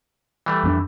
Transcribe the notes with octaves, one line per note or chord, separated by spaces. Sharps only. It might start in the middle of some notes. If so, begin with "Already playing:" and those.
E3 G3 A3
F2 B3 D4